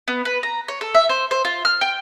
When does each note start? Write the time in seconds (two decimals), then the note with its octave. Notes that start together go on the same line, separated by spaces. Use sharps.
0.08 B3
0.25 B4
0.43 A#5
0.68 C#5
0.81 A4
0.94 E5
1.09 C5
1.31 C5
1.45 F4
1.65 F6
1.81 G5